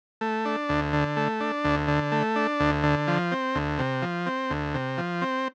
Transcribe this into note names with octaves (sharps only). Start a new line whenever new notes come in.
A3
D4
D2
D3
A3
D4
D2
D3
A3
D4
D2
D3
F3
C4
D2
C3
F3
C4
D2
C3
F3
C4